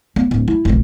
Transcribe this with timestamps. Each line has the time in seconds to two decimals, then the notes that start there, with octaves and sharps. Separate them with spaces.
0.16 B3
0.31 D1
0.48 E4
0.65 F1 A#1